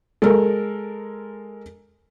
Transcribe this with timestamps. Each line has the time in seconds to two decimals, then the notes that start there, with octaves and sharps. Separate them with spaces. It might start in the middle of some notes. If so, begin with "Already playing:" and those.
0.22 G#3 A4 A#4